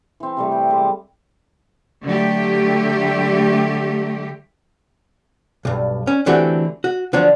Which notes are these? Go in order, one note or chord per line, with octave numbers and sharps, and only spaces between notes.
E3 C4
C3 G3 A3
G5
G3 G#3 D6
D3 F#3 A3 G4
B1 G2
C#4
D3 E3 A3 C4 F#4 G4
F#4
D3 F3 F#3 D4